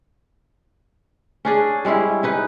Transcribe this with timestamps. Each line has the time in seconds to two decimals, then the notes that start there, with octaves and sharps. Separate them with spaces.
1.45 C#4 D4 G#4
1.85 G3 G#3 C#4 E4
2.23 C#4 D#4 B4